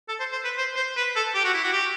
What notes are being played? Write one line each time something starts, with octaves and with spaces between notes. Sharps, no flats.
A4
C5
C5
B4
C5
C5
B4
A4
G4
F#4
E4
F#4
G4